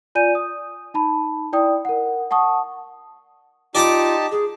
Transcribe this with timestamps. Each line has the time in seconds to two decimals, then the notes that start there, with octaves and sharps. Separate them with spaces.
0.15 F4 D5 G#5 G6 D#7
0.35 D#6
0.94 D#4 A5 B5
1.53 E4 D5 G5 D#6
1.85 A#4 F#5
2.31 F#5 A5 C#6 D#6
3.75 D#4 F4 G4 D5 A5 A#5 D6
4.31 G#4